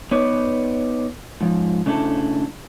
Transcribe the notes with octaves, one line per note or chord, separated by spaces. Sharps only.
B3 D#4 B4 C#5 D5
G#2 F3
C#3 A3 D4 E4 A4